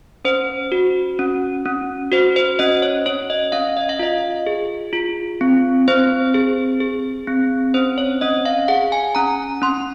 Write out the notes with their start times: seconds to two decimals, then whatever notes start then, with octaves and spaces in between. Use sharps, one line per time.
0.25 C#4 C5
0.72 F#4
1.19 C#4
1.65 C#4
2.12 F#4 C5
2.36 C5
2.59 C#4 D#5
2.82 C#5
3.06 C#4 C#5
3.30 D#5
3.52 C#4 F5
3.77 D#5
3.89 F5
3.99 F4 D#5
4.47 G#4
4.93 F4
5.41 C4
5.88 C4 C5
6.34 G#4
6.80 G#4
7.27 C4
7.74 C#4 C5
7.98 C#5
8.21 C#4 D#5
8.45 F5
8.68 G#4 F#5
8.92 G#5
9.15 C#4 A#5
9.62 C#4 C6